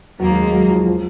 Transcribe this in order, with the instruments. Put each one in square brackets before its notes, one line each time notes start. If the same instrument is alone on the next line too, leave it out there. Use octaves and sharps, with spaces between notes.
[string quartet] D#2 D#3 A#3 [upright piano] F#3
[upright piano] G#3
G#3
F#3
F3
F3